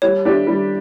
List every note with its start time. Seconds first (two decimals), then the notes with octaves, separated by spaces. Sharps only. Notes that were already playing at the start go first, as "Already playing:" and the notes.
0.02 G3 C#5
0.25 D4 G4
0.47 G3